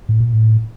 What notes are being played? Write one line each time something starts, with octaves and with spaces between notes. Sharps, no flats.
A2
A#2
A2